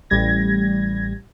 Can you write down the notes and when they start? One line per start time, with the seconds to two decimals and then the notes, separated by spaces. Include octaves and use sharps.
0.10 A1 G3 G#6 A#6